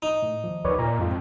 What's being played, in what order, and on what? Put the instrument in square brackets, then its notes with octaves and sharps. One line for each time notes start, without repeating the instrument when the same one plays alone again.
[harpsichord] D#4
[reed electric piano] A2
D#2 F3
[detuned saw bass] D#2 [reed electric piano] B4 C#5 D5
[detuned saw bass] A#2 [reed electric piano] A#5
[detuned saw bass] F2 [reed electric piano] G#2 F4